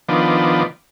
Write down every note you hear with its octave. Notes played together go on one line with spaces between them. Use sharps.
D#3 F3 B3 D4